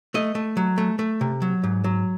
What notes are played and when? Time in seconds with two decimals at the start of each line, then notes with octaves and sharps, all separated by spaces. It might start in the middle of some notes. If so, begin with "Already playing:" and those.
0.14 A3 D#5
0.35 A3
0.57 F#3
0.78 A3
0.99 A3
1.21 C3
1.42 F#3
1.63 G#2
1.84 F#3